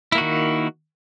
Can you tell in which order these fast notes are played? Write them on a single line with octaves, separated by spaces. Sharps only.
E4 A#3 F#4 D#3